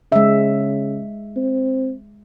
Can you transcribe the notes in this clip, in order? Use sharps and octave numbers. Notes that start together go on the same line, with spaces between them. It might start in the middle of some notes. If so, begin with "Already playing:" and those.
C#3 G#3 E5
C4